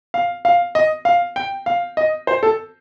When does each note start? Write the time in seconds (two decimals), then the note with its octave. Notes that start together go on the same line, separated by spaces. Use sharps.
0.14 F5
0.45 F5
0.75 D#5
1.05 F5
1.36 G5
1.66 F5
1.97 D#5
2.27 C5
2.43 A4